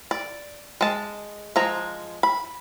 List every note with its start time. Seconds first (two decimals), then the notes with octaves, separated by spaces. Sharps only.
0.11 D5
0.81 G#3 A5
1.56 F3 G#3 A#5
2.23 B5